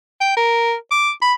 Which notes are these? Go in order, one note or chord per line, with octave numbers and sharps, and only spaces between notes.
G5
A#4
D6
B5